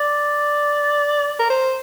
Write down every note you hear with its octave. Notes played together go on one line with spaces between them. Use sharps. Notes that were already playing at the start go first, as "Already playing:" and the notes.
Already playing: D5
A#4
C5